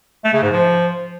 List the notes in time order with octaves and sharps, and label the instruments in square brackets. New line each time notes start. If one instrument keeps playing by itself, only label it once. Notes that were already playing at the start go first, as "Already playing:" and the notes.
[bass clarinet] A3
C#3
G#2
F3